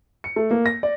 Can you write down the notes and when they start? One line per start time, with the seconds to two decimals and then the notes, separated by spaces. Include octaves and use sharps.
0.24 C#7
0.36 A3
0.51 A#3
0.66 A#6
0.83 D5